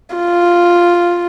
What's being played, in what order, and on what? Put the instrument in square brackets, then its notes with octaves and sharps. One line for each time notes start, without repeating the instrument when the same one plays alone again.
[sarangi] F4